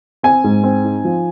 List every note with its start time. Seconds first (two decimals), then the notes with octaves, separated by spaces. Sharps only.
0.23 C4 G#5
0.44 G#2
0.63 C4
0.84 D#4
1.05 F3